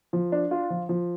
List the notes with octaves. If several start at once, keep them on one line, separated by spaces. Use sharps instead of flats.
F3
D4
F4
F3
F3